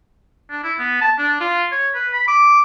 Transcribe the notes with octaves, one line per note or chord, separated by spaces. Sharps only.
D4
E4
B3
A5
D4
F4
C#5
B4
B5
D6